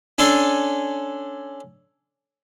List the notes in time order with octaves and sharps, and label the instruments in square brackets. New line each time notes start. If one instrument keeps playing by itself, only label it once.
[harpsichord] C#4 D4 A4 G#5 C6